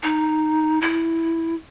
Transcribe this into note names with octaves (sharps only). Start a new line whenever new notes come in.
D#4
E4